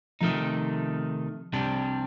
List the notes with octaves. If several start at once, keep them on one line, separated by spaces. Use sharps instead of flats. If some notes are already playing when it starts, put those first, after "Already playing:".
C3 D#3 F3 A3 D#4
C2 C3 G3 D4